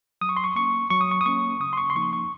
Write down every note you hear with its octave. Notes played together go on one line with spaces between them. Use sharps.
F#3 D#6
C#6
C6
C#6
A#3 C#4 C#6
F#3 C#6
D#6
C#6
D#6
A#3 C#4 C#6
C#3 D#6
C6
C#6
C6
F3 A#3 D#4 C#6
C#6